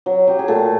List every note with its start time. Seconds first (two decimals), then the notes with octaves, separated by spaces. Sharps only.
0.06 F#3
0.27 F#3 G4
0.39 G#4
0.48 A#2 A3 A4